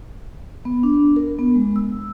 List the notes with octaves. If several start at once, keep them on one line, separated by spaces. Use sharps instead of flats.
B3
D4
A#4
B3
G#3
E6